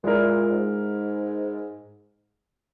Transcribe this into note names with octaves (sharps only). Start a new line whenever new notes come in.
A#2 G#3 E4 A#4
G#2